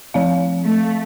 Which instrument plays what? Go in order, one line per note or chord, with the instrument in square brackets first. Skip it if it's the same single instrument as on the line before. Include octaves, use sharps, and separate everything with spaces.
[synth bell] F3 C4 F5
[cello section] A3